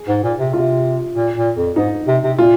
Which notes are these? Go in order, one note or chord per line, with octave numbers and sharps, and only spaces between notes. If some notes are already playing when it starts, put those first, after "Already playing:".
Already playing: G#4
G#2
A#2
C3
C3 F4
A#2
A#2
F2
G#2 D#4
C3
C3
A#2 F4